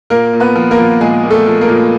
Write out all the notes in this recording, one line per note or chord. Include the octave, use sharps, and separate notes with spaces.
A#2 A#3 A#4
A#2
B3 B4
F3
A#3 A#4
F3
A#2 G#3 G#4
A#2
A3 A4
F3
A#3 A#4
A#2